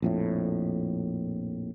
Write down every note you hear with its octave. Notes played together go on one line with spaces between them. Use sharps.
A#1 F2 A2